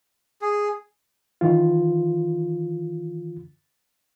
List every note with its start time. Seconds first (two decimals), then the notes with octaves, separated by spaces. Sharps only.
0.42 G#4
1.41 D#3 E3 F4